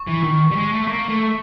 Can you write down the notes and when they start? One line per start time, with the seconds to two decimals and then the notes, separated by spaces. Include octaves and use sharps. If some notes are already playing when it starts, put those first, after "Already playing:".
Already playing: C#6
0.08 E3
0.24 D#3
0.51 G3
0.56 G#3
0.72 A3
0.88 A#3 C#6
1.09 A3